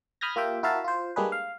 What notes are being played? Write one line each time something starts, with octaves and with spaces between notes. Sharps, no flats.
B5 D#6 F6 G6 G#6 A#6
A#3 F4 G4 E5 G5
E4 F#4 A#4 E5 F5 A5
F4 C5
G3 G#3 A#3 D4 G#4 B4
F5